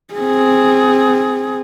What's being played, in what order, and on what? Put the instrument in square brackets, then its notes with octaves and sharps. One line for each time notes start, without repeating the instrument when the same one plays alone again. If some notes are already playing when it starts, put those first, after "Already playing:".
[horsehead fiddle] C4 G#4